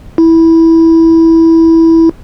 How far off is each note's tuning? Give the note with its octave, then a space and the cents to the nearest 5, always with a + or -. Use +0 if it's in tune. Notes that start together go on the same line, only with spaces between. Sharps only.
E4 -10